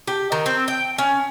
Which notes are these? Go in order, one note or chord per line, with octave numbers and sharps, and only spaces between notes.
G4
D#3
C4
G5
C#4